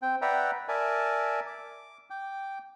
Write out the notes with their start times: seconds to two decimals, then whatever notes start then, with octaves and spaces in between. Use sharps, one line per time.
0.02 C4 G5
0.22 B4 D5 E5 F#5 G5 A#5
0.68 A#4 D5 E5 G#5 A5
1.47 D6
2.10 G5 D6